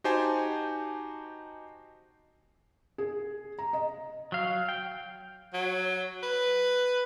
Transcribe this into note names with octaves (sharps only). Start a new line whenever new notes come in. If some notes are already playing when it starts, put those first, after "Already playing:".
D#4 F#4 G4 C5 G#5 A5
G#4
A#5
D#5
F#3 F5
G5
F#3
B4